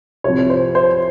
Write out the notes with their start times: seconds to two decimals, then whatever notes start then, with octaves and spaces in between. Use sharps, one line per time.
0.24 C2 C3 F3 C#5
0.50 C5
0.75 C5